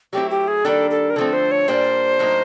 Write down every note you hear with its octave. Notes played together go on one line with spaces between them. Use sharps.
F#3 A3 C4 E4 G4
G4
G#4
D#3 G3 A#3 D4 G4 A4
A4
A#4
D3 F3 A3 C4 A4
C5
C#5
A#2 G3 A#3 D4 G4 C5
A2 F#3 A#3 D#4